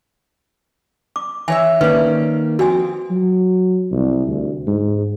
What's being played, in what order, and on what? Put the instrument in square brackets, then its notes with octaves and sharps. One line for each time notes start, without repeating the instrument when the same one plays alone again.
[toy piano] D6
[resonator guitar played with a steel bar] E3 C#5 E5 [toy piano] G#5
[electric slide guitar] D#3 A#3 [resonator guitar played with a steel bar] C#4 D5 [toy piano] B4
[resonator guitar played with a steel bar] F2 C4 [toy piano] F#4 G#5
[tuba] F#3
C2
D2
G#2